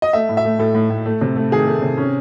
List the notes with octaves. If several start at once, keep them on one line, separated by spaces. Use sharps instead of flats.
D#5
A3 E5
A2
E5
A3
A2 A4
A2
A2
A3
C3
A3
D#3 G#4
A3
C3
C#4